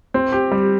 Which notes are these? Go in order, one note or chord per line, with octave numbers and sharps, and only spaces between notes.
C4
G4
G3